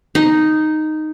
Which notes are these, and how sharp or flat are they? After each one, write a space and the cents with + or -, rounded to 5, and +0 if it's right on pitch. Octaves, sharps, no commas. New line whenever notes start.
D#4 -5